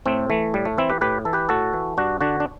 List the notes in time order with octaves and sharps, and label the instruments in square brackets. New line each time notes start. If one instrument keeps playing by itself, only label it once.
[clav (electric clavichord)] A2 A3 C4
E3 A3
A2 G3
A3
E3 C4 E4
G4 B4
A2 G4 B4
E3 A4
G4 B4
A2 F#4 A4
E3
G2 D4 F#4
D3 D4 F#4
D4